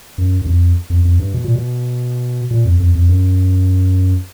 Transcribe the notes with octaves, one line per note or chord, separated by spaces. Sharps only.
F#2
F#2
F2
F2
F2
G2
B2
A#2
B2
A#2
F2
F2
F2
F#2